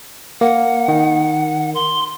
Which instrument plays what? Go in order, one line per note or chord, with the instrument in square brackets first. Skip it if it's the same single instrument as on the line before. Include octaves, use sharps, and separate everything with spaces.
[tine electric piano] A#3 [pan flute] F#5
[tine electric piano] D#3
[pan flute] C6